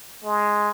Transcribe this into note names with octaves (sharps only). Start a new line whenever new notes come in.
G#3